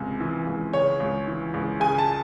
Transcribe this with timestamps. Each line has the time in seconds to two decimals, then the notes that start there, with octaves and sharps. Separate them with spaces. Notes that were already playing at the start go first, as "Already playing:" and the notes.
Already playing: C#2 C3
0.20 E3
0.47 C#2
0.73 C#3 C#5
1.00 C#2
1.27 E3
1.54 C#2
1.80 C#3 G#5
1.98 A5